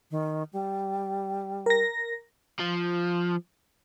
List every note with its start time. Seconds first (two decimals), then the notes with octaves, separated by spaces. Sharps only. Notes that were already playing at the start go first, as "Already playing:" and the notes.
0.11 D#3
0.53 G3
1.66 A#4 A#6
2.60 F3